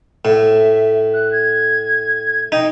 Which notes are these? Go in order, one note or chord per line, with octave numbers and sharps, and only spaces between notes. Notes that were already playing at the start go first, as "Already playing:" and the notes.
A2 E5
F#6
G#6
D#4 G5